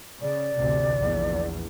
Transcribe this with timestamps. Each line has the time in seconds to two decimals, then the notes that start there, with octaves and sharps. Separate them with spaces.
0.21 C#3 D5
0.56 A1 D2 C3
0.98 A#1 E2